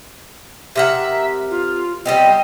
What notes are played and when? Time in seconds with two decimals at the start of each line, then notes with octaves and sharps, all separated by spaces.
0.76 C3 A#4 E5 F#5
1.51 F4
2.05 G3 B3 C4 D#5